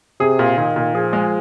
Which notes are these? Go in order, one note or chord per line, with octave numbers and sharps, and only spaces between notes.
C3 G#4
A#2
A#2 D#3
A#2
F3 G#4
G#3